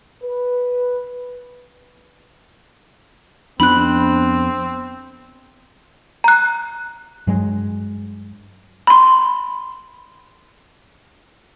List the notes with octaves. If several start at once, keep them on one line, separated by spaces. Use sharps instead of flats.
B4
F2 B3 C4 D4 B5 F#6
A#5 F#6
G2 F#3 G#3
B5 C6